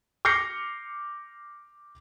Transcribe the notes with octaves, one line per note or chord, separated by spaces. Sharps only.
D6 F6 G6 A#6 C7 C#7